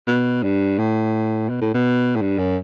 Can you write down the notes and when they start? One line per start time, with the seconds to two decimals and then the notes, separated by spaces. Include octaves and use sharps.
0.07 B2
0.43 G2
0.79 A2
1.49 B2
1.61 A2
1.74 B2
2.16 A2
2.21 G2
2.38 F#2